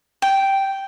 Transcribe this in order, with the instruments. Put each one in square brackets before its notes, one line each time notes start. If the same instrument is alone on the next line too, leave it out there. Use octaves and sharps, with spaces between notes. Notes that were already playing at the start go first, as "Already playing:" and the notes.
[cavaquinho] G5